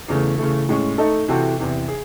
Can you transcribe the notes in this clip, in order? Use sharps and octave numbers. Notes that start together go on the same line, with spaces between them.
E2 C#3 E3 A3
C#3 E3 A3
A2 G#3 C#4
A3 D#4 A4
C3 E3 C4 F#4 A4
E2 C3 E3
G#4